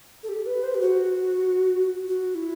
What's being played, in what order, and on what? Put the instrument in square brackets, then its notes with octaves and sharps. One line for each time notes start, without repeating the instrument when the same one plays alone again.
[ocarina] A4
G4
B4
C5
G4
F#4
F#4
E4